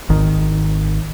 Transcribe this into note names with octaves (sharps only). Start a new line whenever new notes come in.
G#1 D#3